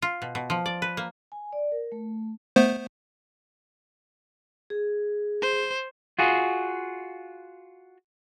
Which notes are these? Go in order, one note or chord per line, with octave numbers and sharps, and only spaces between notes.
F4
B2
B2
F3
D5
B4
A#3
G#5
D5
A#4
A3
A3 B3 C5
G#4
C5
F4 F#4 G#4